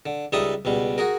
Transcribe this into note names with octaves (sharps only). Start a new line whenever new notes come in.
D3
C#2 G3 D#4 A4 E5 D#6
C#2 B2 G3
F#4 G#4 A#4